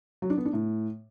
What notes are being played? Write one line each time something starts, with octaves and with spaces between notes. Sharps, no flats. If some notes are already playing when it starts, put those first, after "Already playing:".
F#3
D4
B3
D4
A2